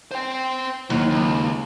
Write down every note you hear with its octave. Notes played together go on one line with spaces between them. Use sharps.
C5 G5
D#2 F#3
C#2